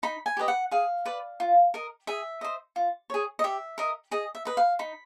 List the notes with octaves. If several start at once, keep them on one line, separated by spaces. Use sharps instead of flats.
D#4 B5
G#5
G4 B4 D#5
F#5
G#4 F5
B4 D5
F4
A#4 D#5
G#4 E5
C5 D#5
F4
G#4 C#5
D#5
G4 E5
A#4 D#5
G#4 D#5
E5
B4 D#5
F5
D#4 B5